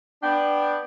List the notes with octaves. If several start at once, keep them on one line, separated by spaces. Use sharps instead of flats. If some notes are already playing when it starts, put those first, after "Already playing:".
B3 D4 G5